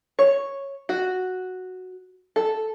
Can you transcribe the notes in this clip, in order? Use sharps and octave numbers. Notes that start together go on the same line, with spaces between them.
C#5
F#4
A4